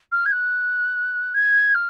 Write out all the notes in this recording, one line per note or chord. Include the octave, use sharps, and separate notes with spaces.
F6
G#6
F#6
G#6
F6